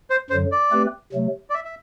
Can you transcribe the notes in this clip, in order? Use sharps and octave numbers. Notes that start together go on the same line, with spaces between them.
C5
F#2 D3 F#3 C5
D5
A3 C4 G4 B4
C3 F#3 A3
D5
E5
E5